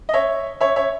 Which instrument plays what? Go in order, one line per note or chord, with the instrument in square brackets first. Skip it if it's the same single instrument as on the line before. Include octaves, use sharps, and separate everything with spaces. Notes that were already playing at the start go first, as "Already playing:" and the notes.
[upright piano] D#5
C#5 E5
C#5 E5
C#5 E5